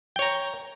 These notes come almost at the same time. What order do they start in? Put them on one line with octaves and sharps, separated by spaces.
G5 C#5 A#5